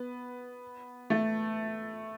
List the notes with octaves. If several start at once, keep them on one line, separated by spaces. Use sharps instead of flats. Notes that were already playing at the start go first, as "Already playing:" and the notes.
Already playing: B3
A3